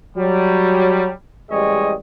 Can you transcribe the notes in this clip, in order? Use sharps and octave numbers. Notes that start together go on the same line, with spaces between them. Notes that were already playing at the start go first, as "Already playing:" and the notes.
F#3 G3
A1 G3 G#3 C#5 D#5